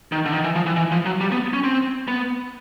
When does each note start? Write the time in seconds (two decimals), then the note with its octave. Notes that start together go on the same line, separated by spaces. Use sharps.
0.12 D#3
0.26 D3
0.33 D#3
0.44 E3
0.56 F3
0.66 E3
0.76 E3
0.92 F3
1.06 F#3
1.21 G3
1.32 B3
1.53 C#4
1.64 C4
2.08 B3